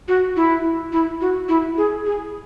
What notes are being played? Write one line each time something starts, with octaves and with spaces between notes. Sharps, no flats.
F#4
E4
E4
F#4
E4
G#4
G#4